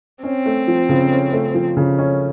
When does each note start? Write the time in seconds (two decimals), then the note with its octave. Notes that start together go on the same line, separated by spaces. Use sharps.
0.23 C4 C#4
0.46 A3
0.68 F3
0.89 C#3
1.11 C#4
1.33 A3
1.54 F3
1.77 C#3
1.98 C#4